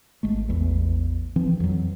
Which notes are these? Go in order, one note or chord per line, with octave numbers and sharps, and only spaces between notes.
G#1 G#3 A3
A1 E2 E3
E3 F3 C4
F2 E3 F#3